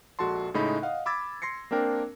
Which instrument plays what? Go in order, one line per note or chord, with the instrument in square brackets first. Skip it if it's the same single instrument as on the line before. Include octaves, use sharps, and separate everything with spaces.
[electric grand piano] A#1 G#3 F#4 A4 A5 C6
A2 C#3 G#3 D#4 A4 B5
D#5 F5 F#5
B5 D6 E6 G#6 A6
C6 A#6 C7 C#7
A#3 C4 D4 A#4 G5